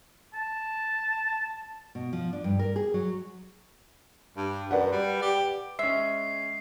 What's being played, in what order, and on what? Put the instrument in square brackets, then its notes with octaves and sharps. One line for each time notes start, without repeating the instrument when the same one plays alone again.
[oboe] A5
[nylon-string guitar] B2
F3
D4
G2
A#4
G#4
F#3
[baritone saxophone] G2
[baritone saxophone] F#2 [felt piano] B4 D5 F#5
[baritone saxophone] G3
G4
[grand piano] G#3 C#4 [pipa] E5 [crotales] C7